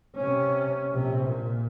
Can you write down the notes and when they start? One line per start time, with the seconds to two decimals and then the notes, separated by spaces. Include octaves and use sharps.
0.16 C3 C#4
0.93 A#1 C3
1.26 A#2